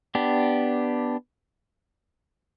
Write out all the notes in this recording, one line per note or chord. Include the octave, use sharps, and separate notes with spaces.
B3 D4 G4